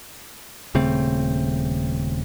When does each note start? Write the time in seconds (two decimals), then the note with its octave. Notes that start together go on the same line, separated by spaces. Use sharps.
0.75 D#1 C#3 A3 C4